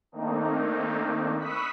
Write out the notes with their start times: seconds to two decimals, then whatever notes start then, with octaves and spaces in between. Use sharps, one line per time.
0.12 D#3 A3 A#3 C4 D4 D#4
1.38 B5 C#6 D#6 E6 F#6 B6